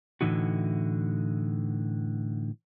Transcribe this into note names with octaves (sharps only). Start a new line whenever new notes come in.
A2 D3 E3 D#4 F#4